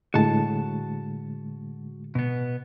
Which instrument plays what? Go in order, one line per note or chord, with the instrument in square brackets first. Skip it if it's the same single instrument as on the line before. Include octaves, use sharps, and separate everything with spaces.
[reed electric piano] A2 D3 G#3 [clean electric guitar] F#4 A5
[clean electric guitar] B2 B3